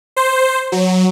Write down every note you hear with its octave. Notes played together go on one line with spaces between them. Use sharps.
C5
F#3